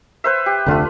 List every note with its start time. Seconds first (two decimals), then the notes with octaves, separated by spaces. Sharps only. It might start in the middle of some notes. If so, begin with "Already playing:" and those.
0.24 B4 C5 E5
0.46 G4
0.66 F1 D2 D3 A3 F4 B4